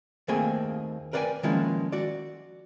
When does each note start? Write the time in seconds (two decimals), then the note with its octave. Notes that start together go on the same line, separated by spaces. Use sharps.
0.28 D#2 A3 A#3 C4 G#4 G#5
1.13 A#4 B4 D5 F5 G5 G#5
1.43 D#3 F3 G#3 A#3 C#4 E4
1.92 F#4 D5